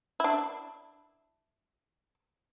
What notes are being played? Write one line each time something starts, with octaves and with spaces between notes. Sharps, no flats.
D4 E4